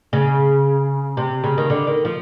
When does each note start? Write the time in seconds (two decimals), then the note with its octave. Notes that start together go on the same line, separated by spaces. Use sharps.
0.13 C#3
1.17 C3
1.44 C#3
1.58 D#3
1.70 D3
1.87 D#3
2.05 F3